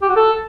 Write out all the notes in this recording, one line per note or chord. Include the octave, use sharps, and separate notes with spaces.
G4
F#4
A4